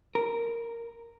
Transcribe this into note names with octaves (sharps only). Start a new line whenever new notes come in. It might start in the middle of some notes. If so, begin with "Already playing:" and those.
A#4